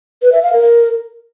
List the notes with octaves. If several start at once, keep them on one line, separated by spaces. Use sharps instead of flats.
B4
E5
F5
A#4